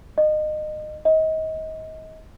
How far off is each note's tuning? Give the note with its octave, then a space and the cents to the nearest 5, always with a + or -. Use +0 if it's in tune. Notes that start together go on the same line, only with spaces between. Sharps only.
D#5 -25
D#5 +30